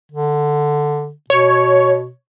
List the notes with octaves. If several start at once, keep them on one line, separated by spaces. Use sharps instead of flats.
D3
B2 C#5